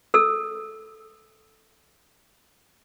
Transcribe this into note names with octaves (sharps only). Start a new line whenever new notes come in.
A4 E6